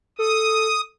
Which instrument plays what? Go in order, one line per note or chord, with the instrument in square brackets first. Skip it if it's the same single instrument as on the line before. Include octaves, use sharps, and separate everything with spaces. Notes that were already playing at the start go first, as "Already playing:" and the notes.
[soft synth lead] A4 [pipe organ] D#6